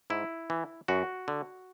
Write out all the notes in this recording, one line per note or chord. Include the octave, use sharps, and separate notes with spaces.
G#2 E4
E3
F#2 F#4
D3